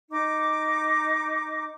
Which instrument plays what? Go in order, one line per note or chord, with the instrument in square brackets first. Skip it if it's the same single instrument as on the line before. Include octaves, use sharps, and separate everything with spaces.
[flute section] D#4 D6